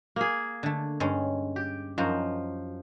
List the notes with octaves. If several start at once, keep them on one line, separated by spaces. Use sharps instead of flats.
A#3 G#4
D3 A3
G2 G#3 C#4
G4
F#2 F3 D#4 F#4